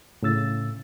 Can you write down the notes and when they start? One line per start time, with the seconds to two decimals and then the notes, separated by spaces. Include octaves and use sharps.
0.23 A2 C#3 E6 A6